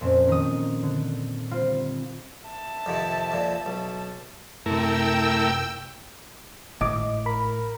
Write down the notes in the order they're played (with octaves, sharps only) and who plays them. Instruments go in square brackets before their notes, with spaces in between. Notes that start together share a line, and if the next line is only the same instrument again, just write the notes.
[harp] F2 A#2 C4 C#4
D#3 D#6
D3
G3 C4 F4
[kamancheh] E5 A5
[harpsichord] F2 C3 D#3
F2 A#2
B1
[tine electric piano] F#2 C3 [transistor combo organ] A3 E4 A#4 [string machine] G5 E6
[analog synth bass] G#1 [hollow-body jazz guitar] A2 [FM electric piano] D#5 D6
[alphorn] A#4 [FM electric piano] B5